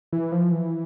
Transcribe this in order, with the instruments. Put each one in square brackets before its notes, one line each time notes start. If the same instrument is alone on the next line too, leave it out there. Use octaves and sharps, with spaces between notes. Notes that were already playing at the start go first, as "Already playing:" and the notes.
[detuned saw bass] E3
F3
E3